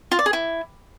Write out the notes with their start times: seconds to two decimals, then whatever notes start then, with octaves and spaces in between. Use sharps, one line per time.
0.12 F4
0.19 D5
0.26 G#4
0.33 E4